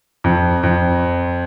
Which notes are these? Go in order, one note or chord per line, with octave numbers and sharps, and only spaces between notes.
F2
F2